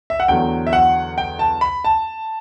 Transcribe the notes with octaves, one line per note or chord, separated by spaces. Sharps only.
E5
F#5
E2 D3 F#3 A3 G5
E5
F#5
G5
A5
B5
A5